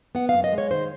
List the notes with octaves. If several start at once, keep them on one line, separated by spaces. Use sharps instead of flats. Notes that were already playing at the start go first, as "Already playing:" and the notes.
B3 F#5
F#2 F5
D#5
G#3
C#5
D#3 C5